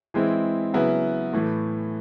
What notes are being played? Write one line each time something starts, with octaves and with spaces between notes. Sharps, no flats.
E3 G#3 C4 E4
C#3 F#3 B3 E4
A2 E3 A3